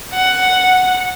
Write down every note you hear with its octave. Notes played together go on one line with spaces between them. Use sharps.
F#5